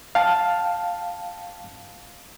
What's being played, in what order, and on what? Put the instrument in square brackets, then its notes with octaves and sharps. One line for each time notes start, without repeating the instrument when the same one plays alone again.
[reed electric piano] F5 G5 A5